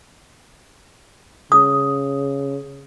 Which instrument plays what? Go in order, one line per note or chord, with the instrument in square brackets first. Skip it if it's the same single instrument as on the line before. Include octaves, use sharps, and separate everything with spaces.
[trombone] C#3 [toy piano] D#6